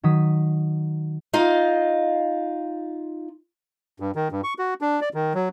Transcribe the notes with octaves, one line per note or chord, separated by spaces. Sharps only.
D#3 F#3 D#6 B6
D#4 F4 D#5 F5
G2
D#3
G2
C#6
F#4
D4
D5
D#3
F#3